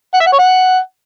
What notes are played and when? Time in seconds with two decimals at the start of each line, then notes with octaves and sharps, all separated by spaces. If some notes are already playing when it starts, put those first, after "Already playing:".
0.14 F#5
0.20 E5
0.26 F#5
0.33 C#5
0.39 F#5